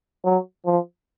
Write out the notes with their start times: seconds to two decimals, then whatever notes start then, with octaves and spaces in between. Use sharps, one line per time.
0.25 F#3
0.66 F3